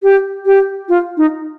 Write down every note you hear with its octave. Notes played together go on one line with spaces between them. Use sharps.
G4
G4
F4
D#4